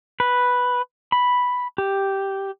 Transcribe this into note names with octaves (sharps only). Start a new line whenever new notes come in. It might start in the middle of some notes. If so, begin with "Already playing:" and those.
B4
B5
G4